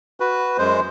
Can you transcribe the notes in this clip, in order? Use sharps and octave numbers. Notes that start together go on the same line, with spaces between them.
F#4 B4
F#2 G#3 C5